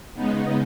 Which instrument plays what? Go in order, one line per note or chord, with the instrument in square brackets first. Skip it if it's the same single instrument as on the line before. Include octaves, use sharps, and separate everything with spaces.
[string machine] C#3 G#3 B3 D#4